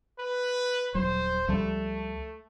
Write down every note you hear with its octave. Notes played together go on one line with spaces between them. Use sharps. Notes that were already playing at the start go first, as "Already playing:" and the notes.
B4
D#1 F#3 C5
C#2 F3 G3 A3